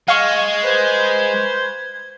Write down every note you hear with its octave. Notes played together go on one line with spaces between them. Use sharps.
G#3 F5 C#6 G#6
B4 C5